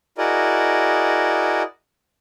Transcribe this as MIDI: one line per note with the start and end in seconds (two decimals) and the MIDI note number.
0.18 1.62 64
0.18 1.62 66
0.18 1.62 68
0.18 1.62 70
0.18 1.62 74
0.18 1.62 75